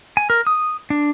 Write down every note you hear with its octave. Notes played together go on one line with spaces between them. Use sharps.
G#5
A#4
D#6
D4